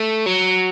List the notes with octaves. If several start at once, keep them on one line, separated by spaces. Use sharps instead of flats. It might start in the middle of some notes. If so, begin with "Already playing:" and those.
Already playing: A3
F#3